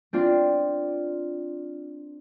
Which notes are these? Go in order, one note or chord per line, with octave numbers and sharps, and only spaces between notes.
C4 D4 F4